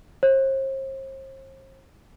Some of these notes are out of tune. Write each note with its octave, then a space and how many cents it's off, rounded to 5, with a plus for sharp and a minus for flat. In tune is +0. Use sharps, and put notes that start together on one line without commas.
C5 +40